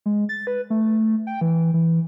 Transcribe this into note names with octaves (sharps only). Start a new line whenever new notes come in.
G#3
A6
B4
A3
G5
E3
E3